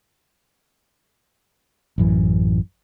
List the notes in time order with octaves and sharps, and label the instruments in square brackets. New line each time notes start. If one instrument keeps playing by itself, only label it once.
[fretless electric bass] A1 F#2 E3